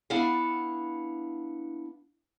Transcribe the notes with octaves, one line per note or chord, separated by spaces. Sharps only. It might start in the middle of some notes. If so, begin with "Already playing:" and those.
B3 D4 E4 F5 F#5